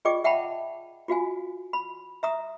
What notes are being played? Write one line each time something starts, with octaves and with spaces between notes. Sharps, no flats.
F4 G#4 D5 D#5 G5 D6
E5 F#5 G5 A5 B5
F4 F#4 F5 G#5
B5
E5 A#5 D#6